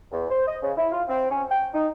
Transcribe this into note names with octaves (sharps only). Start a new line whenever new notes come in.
E2
C5
D#5
C#3
E4
F4
C4
C#4
G5
D#4